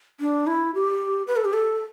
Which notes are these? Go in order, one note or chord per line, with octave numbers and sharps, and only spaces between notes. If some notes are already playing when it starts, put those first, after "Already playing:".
D4
E4
G4
B4
A4
G4
A4